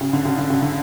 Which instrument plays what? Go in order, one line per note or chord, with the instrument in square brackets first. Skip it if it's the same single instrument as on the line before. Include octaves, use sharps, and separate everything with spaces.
[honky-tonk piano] C#3
D3
C#3
D3
C#3
D3